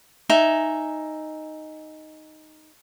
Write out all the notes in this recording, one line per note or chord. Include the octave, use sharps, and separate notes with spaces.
D#4 E5 G#5